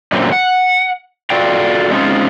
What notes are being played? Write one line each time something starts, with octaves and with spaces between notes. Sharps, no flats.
F#2 A#2 D3 F#3 A3 C4
F#5
F4 F#4 A4 D5 F5 G5
G#3 C4 C#4 D#4 F4